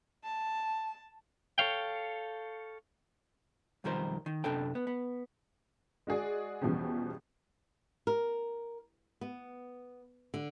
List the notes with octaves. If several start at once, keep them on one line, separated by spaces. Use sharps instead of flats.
A5
A4 C#5 F5 G5
B1 F2 D#3 G3 A#4 C5
D#3
F#2 C3 D4 A4 G5
B3
B3
G#3 F#4 G#4 D5
E2 B2 E3 F3 G3 C#4
A#4
B3
D3